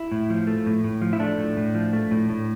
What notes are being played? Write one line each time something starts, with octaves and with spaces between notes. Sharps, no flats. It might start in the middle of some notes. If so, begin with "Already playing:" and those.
Already playing: E4
A2
F3
A3
A2
A2
F3
E4
A3 D4
A2
A2
F3
A3
A2
A2